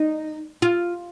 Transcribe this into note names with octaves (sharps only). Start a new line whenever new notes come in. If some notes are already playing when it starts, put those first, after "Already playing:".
Already playing: D#4
F4